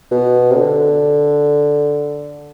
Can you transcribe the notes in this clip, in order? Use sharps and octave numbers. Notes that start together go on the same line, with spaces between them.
B2
C3
D3